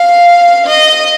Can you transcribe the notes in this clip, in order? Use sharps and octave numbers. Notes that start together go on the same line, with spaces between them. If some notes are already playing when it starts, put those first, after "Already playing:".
Already playing: F5
D#5